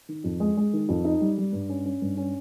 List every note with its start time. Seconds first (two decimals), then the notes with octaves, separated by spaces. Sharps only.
0.09 D#3
0.24 F2
0.40 G#3
0.57 G#3
0.73 D#3
0.89 F2
1.05 D#4
1.21 G3
1.38 G3
1.53 G2
1.69 C#4
1.86 C#4
2.02 G2
2.17 C#4